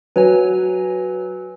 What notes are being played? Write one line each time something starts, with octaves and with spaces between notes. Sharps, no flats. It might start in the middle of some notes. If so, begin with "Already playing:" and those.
F#3 B4 C#5 G#5